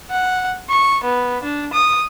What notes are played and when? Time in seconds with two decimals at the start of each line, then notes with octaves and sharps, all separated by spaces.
0.11 F#5
0.69 C#6
1.04 B3
1.43 D4
1.73 D#6